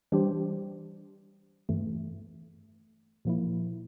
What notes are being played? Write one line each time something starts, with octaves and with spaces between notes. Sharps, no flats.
E3 G3 D4 G4 C5
G2 E3 A3
A#2 F3 A#3 E4